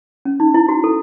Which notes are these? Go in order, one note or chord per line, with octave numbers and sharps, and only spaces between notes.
C#4
D#4
E4
F#4
A4